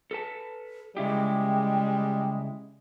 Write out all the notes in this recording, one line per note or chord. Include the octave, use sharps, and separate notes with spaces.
A4 B4 A5
C#3 G3 G#3 E4 G4 G5